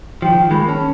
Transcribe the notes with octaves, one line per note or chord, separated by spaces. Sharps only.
D#3 F3 G5
D#3 G#3 A#3 B5
C#4 A5